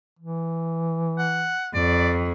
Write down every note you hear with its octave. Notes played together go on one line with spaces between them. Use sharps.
E3
F#5
F2 D5